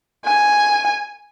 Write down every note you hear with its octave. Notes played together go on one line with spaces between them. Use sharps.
G#5